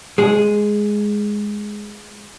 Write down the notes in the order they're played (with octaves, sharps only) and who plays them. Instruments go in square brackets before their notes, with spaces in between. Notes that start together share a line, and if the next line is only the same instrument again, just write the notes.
[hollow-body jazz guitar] G#3 G#4